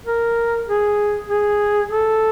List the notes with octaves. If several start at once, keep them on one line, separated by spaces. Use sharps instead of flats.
A#4
G#4
G#4
A4